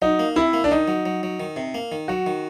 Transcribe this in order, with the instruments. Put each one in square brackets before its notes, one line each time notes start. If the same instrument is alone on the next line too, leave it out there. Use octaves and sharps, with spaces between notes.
[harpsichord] F#3 [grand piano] D#4
[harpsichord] A#3
[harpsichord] C3 [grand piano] E4
[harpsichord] A#3
[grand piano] D4
[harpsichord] D#3 [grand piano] D#4
[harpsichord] F#3
F#3
F#3
D#3
C3
A#3
D#3
[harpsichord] F#3 [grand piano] F#4
[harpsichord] D#3